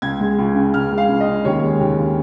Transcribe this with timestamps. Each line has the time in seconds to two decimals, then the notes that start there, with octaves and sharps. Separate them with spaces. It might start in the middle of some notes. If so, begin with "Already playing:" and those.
0.02 C#2 G#6
0.20 G#3
0.38 C#2
0.55 C#3
0.74 C#2 F6
0.92 G#3
0.98 F5
1.09 C#2
1.20 D#5
1.27 C#3
1.45 D#2 C#5
1.62 G#3
1.80 D#2
1.98 C#3